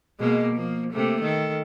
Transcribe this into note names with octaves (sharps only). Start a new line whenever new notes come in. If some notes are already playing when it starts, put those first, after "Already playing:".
B2 G#3 A#3
F3 A#3
C3 A3 A#3
D#3 A4